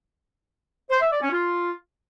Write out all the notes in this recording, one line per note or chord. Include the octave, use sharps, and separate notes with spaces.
C5
E5
D5
C#4
F4